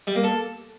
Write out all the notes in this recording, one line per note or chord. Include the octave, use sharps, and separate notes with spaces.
G3
A#3
A4